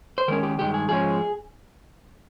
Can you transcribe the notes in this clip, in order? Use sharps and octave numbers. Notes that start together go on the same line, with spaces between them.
C5
D#3 G#3 C#4 A#4
G4
G2 D#3 G#3 G4
G#4
G#2 F3 G#3 C#4 G#4